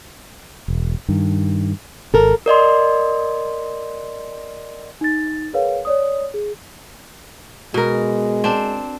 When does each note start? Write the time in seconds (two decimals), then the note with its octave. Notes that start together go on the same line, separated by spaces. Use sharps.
0.68 E1
1.09 G2 D#3
2.14 G#1 A4 A#4
2.46 A#4 D5 D#5 C6
5.01 D#4 A6
5.53 G#4 A#4 B4 C#5 F5
5.85 C#5 D5 D#6
6.34 G#4
7.74 B2 G#3 A#4
8.44 C4 D4